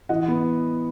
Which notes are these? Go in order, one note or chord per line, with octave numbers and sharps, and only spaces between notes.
E3 D#5 F#5
B3